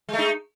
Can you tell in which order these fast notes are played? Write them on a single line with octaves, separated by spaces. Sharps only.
G#3 A3 D#4